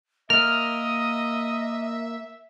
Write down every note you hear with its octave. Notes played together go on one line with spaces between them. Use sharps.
A#3 A#4 D#5 E5 F6